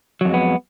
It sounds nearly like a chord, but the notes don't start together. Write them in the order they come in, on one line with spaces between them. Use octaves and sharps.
F#3 F2 G#3 B3